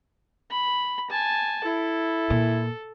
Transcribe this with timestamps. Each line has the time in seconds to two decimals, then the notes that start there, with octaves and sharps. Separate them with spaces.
0.51 B5
1.10 G#5 A5
1.64 E4 A4
2.30 A#2